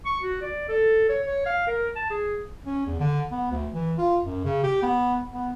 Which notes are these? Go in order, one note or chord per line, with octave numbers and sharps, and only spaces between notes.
C#6
F#4
D5
A4
C#5
C#5
F5
A#4
A5
G#4
C#4
E2
D3
B3
D2
E3
F4
F#2
C#3
G4
B3
B3